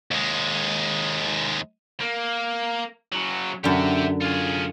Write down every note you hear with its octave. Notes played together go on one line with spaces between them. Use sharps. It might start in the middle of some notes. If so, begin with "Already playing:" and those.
D#2 G#3
A#3
C#3 F#3
F#2 D3 G4 E5
F4 G#4